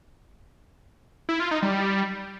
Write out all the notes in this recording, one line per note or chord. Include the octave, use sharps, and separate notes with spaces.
E4
F4
D#4
G3